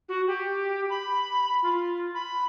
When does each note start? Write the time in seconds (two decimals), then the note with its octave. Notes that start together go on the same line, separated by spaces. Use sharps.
0.09 F#4
0.27 G4
0.90 B5
1.63 F4
2.14 B5